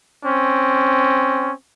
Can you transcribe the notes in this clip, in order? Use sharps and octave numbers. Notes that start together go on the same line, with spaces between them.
C4 C#4